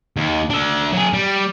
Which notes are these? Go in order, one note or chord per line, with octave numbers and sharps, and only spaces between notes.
D#2
D4 E5
F#3 G#4
G3